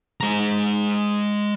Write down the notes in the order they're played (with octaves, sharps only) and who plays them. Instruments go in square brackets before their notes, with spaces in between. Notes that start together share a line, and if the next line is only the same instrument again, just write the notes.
[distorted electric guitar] G#3 A#5